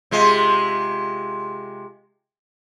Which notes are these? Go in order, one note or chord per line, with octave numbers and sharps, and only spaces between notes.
C3 G#3 F4